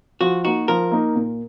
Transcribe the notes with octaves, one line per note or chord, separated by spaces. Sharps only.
F3 F#4
A#3 D#4 F#4
F3 A#4
A#3 D#4
A#2